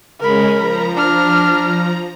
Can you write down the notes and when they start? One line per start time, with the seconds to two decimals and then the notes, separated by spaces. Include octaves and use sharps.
0.20 C#3 G#3 C#4 A#4 B5
0.55 F3 A#5
0.94 D4 F6